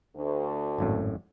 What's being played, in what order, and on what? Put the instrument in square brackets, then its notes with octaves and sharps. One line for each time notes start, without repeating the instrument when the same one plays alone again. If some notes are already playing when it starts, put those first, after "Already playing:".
[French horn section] D2
[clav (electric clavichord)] G#1 F#2 A2